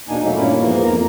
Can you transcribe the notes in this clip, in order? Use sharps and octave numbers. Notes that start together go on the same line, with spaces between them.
E2 B2 A#3 D4 D#4 G#5
F#3 A3 A#3 D#4
G2 A#2 D#3 A#3 C#4 E4
E2 G#2 E3 F3 A#3 A#4
F2 A#3 A#5